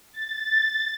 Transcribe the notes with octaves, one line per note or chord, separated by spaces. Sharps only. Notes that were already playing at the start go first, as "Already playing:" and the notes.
A6